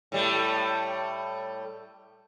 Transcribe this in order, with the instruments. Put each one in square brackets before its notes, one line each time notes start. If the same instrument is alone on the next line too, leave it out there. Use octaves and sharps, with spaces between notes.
[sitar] A2 G3 A3